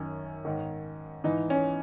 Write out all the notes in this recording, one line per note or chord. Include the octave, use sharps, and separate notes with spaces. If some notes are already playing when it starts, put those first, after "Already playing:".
Already playing: F#2 D#3 C#4
G#2 D#3
G#2 E3 D#4
C#4